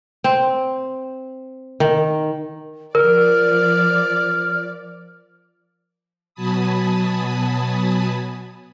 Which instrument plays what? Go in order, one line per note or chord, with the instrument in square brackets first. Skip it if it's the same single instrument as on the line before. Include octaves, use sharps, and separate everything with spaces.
[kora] C4
D#3
[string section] F3 D5 [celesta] A#4 [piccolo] F6
[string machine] B2 F#3 G#5 A5 B5 D#6